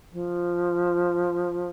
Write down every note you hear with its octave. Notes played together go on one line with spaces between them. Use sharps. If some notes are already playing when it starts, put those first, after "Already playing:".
F3